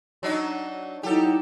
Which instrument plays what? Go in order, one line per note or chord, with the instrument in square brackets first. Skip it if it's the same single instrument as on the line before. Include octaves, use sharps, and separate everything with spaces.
[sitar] F#3 D4 D#4
[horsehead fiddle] F#3 D#4 [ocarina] E4 [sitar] G4 A4